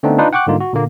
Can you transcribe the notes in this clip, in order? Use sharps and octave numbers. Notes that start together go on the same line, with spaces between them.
D3 A3 B3 C4 D4 D#4
D4 D#4 F4 B4
F#5 G5 C#6 D6 F#6
G#2 D3 G3 A#3 D#4 F4
F#4
A#2 D3 A#3